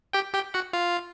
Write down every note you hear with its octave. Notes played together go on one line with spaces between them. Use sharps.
G4 G5
G4 G5
F#4 F#5
F4 F5